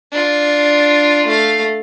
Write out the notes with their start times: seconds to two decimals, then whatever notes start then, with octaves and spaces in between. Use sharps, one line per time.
0.12 D4 F4
1.26 A3 F5